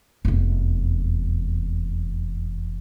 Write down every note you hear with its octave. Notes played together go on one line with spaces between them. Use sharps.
F1 E2